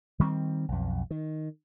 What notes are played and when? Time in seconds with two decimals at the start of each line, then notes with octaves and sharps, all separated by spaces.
0.20 D#3 G3 B3 C4
0.68 B1 F2
1.11 D#3